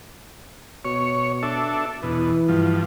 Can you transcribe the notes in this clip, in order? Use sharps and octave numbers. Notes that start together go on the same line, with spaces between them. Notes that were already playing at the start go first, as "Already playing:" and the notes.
B2 C#5
D4 A4 E5
E2 B2 E3
G2 F3